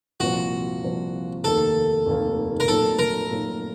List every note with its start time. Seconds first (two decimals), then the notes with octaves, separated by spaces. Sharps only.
0.20 C2 A#2 F3 C4 F#4
0.82 C2 A#2 F3 C4
1.44 F1 D#2 D#3 A#3 A4
2.06 F1 D#2 D#3 A#3
2.60 A#4
2.68 A#2 F#3 A3 D#4 A4
2.99 A#4
3.30 A#2 F#3 A3 D#4